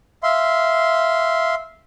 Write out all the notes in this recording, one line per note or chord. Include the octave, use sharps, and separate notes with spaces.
E5 F5 C6